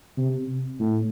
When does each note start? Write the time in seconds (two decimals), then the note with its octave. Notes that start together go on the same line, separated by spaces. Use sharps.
0.17 C3
0.80 A2